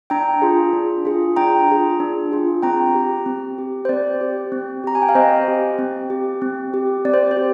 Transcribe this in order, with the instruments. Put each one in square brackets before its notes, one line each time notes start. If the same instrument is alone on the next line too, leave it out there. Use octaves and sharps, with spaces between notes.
[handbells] D4 G5 A#5
F4 G#4
D4
F4 G#4
D4 G5 A#5
F4 G#4
D4
F4 G#4
C4 G5 A#5
G4
C4
G4
C5
C4 D5
G4
C4
G4 A#5
G#5
G5
F5
C4 C5 D#5
G4
C4
G4
C4
G4
C4 D5
C5
C5
G4